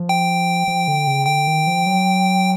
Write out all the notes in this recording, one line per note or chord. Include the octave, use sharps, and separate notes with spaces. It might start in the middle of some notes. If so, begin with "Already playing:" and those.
Already playing: F3
G5
F3
D3
C#3
D3 G5
D#3
F3
F#3